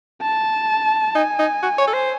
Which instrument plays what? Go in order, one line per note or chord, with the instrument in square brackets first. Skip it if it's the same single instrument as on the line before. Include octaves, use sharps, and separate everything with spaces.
[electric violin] A5
[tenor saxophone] D#4 [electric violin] G#5
[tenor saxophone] D#4
F#4
C#5
A4
C5